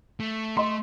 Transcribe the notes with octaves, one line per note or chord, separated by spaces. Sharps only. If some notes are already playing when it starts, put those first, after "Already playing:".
A3
A3 D#5 C6